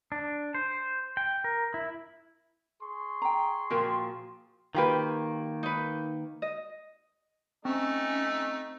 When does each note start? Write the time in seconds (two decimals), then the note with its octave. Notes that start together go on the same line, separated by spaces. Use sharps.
0.12 D4
0.54 C5
1.17 G5
1.44 A#4
1.74 E4
2.82 G#4 C6 C#6
3.22 G5 A#5
3.70 A#2 F3 F#4 A#4 G5
4.75 D#3 A#3 F4 G4 B4
5.63 D#4 B4
6.42 D#5
7.65 A3 C4 C#4 D#4